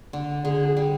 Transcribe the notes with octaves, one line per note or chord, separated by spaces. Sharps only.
D3
D3 G#4
G3